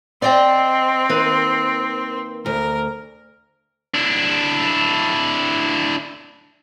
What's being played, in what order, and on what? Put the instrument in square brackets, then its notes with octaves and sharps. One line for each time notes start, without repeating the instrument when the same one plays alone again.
[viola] C4 [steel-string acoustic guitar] D5 D#5 G5
[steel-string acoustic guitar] D#3 A#3 B4
[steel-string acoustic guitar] D2 [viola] A#4
[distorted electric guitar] D4 E4